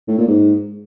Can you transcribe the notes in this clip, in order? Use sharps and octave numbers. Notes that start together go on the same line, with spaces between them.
A2
A#2
G#2